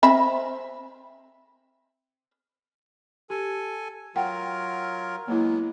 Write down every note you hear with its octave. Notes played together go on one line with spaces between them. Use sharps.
C4 E5 B5
G4 A4 G#5
F#3 F4 A#4 F#5 G5
F#3 G#3 A#3 B3 E4